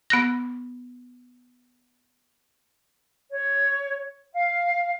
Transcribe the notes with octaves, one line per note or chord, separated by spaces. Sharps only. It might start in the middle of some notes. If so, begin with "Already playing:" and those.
B3 F#6 A#6
C#5
F5